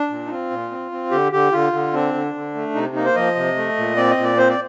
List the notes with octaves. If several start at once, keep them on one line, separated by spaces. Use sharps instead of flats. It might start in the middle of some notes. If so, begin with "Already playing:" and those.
Already playing: D4
A#2
D#4
C4 F4
A#2
C4
C4
D3 G4
D3 G4
D3 F4
D3
C4 D4
D3
D3
A3
C3 D#4
A#3 D#4
C5
F3 D#5
C3
A3
A#2
C4 D5
D#5
A#2
D5
C4 C5
D5